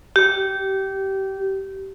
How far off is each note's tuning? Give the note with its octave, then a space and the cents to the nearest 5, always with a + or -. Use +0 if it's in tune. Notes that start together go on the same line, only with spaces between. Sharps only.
G4 -20